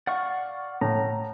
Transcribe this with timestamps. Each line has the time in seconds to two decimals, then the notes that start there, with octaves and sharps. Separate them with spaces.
0.07 D5 F5 F#5 C#6
0.81 A2 A#5